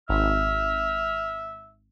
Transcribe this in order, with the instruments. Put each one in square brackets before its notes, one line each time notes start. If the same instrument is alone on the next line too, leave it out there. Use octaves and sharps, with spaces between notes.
[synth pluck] G#1 [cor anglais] E5 [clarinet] F6